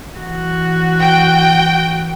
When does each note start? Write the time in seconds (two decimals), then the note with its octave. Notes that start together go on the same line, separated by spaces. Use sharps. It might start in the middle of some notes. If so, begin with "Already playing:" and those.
0.16 E3 F#4
1.00 G5